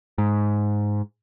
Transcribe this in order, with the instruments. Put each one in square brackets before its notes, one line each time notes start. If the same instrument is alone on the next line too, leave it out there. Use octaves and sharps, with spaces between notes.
[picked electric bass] G#2